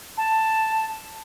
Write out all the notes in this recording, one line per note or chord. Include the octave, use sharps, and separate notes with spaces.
A5